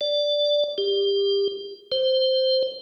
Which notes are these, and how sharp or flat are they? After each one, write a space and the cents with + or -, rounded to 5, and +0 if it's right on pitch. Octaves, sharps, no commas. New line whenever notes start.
D5 +0
G4 +25
C5 -5